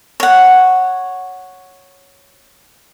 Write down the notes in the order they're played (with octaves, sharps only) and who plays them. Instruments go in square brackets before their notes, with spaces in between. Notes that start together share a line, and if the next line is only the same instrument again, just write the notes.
[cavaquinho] C#5 F#5